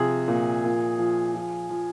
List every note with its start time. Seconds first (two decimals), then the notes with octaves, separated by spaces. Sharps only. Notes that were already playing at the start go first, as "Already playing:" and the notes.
Already playing: C3 F3 G#4
0.28 A#2
0.64 A#2
0.98 F3
1.34 F3
1.70 F3